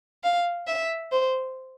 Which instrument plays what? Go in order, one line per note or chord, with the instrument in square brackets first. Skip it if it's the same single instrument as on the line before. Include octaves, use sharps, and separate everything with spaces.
[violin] F5
E5
C5